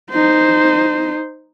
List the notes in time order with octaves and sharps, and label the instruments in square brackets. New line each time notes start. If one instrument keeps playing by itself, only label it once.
[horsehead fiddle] D#4 C5